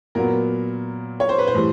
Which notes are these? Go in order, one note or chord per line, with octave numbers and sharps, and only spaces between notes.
A#2 F#3 B3 A#4
C#5
C5
B4
C5
A2 E3 G3